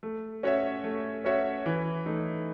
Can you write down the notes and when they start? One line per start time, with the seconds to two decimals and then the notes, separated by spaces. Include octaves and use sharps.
0.03 A3
0.43 C#4 F#4 C#5 E5
0.84 A3
1.24 C#4 F#4 C#5 E5
1.66 E3
2.06 A3 D#4